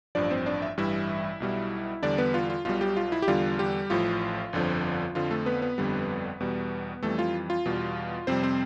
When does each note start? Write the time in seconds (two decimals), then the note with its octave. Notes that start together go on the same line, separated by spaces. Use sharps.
0.15 A1 G2 F3 D4 D5
0.31 C4 C5
0.46 D4 D5
0.62 E5
0.78 A1 G2 E3 G3 E4 E5
1.40 B1 B2 G3
2.03 E2 D3 G3 D4 D5
2.18 B3 B4
2.34 F4
2.50 F4
2.65 B1 B2 G3 F4
2.81 G3 G4
2.97 F4
3.12 E4
3.22 G4
3.28 E2 D3 G3 F4
3.59 G3 G4
3.90 A1 A2 F3 F4
4.53 G1 F2 D3 F3
5.15 F2 D3 F3 F4
5.31 A3 A4
5.46 B3 B4
5.62 B3 B4
5.78 G1 F2 D3 G3
6.40 E2 B2 G3
7.03 F2 E3 G3 A3 A4
7.19 F4
7.50 F4
7.65 E2 B2 G3
8.27 F2 C3 G3 C4 C5
8.43 C4 C5